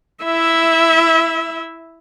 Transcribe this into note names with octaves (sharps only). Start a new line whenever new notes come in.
E4 E5